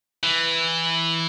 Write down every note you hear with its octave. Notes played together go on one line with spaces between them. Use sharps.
E3